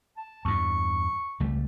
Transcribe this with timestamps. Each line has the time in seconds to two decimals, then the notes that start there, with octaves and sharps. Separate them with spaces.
0.17 A5
0.45 E2 G2 C#6
1.40 C#2 G3 A3